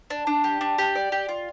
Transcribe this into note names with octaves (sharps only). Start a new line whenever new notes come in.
D4
D4
G4
D4
G4
D5
G4
F4